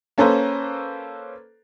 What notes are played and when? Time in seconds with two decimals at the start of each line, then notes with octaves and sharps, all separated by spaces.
0.18 A#3 C#4 A4 B4 C5 A#5